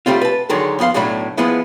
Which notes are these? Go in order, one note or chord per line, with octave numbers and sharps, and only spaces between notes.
F#2 G3 A3 C4 F4
B4 A5
F#2 D3 D#3 F#3 G#3 A4
F2 B3 A4 F5 C6
B1 A2 F#3 A3 D4 B5
E3 F3 G#3 B3 E4